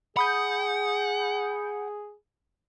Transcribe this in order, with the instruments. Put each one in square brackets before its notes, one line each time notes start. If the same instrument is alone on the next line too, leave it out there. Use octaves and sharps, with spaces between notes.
[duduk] G#4 [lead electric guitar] F#5 [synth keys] B5 D#6 G6